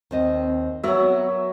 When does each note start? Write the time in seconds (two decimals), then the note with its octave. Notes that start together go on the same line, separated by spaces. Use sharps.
0.11 D#2 C4 D#5
0.84 F#3 B3 F#4 A#4 E5